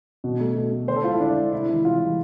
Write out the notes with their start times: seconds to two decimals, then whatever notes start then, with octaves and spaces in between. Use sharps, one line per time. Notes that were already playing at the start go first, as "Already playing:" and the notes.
0.24 B2
0.40 A3
0.56 B2
0.72 A3
0.88 D3 C5
0.96 A4
1.04 G#3 F4
1.12 E4
1.20 D3 D4
1.36 G#3
1.52 C3 E4
1.68 E3 G#3 E4
1.84 C3 F4
2.01 E3 G#3